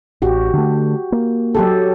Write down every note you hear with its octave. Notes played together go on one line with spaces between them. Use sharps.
A1 F#4 G4
D3 A3
A#3
F#3 G4 A4